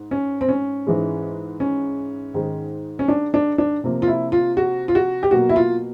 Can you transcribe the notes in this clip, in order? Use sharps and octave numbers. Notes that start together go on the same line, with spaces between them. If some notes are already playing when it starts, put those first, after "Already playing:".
Already playing: G#2
C#4
C4
C#4
G#2 E3 G#3
C#4
G#2 D#3 G#3
C#4
D4
D4
D4
C3 F3 A#3
F4
E4
F4
F#4
F4
F#4
G4
B2 F#3 A#3 F#4
E4
F4